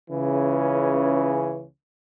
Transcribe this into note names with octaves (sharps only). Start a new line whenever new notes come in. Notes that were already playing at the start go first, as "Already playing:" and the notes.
C#2 C#3 E3 C#4